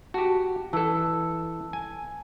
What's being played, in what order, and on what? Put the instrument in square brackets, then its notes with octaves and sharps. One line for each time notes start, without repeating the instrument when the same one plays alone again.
[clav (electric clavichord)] F#4 G4 [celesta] A5
[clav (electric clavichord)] E3 A4 [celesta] A5 E6
[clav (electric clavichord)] G#5